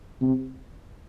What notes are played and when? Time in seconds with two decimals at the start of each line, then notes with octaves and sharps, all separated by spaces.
0.21 C3